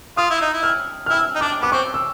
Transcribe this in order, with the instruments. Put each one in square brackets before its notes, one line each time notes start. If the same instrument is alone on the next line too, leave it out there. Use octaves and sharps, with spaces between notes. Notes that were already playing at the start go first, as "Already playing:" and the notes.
[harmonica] F4 [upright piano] D#6
[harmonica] E4
D#4
E4
[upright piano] F6
F6
[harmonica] E4 [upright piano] E6
[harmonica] D#4
[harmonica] D4 [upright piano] D6
[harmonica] B3 [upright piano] D6
[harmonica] C4 [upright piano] C#6
[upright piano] E6